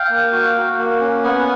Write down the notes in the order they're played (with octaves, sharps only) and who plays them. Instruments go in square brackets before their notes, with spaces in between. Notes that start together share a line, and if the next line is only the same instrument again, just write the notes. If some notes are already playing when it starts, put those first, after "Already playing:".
Already playing: [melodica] F5 G5
A#3
F#4
F#4
A#3
C#4
B3 F#5 G#5